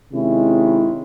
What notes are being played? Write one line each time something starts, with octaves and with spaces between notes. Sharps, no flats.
C3 D#3 G#3 C#4 E4